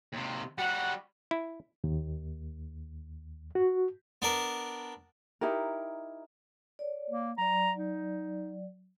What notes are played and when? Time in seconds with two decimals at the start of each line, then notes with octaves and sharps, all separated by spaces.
0.13 D#2 C3
0.58 G3 F#4 F#5
1.31 E4
1.84 D#2
3.55 F#4
4.22 B3 D4 A#4
5.41 D#4 E4 G4 A#4
6.79 C#5 D5
7.10 A#3
7.38 F#3 D5 A#5
7.77 D#4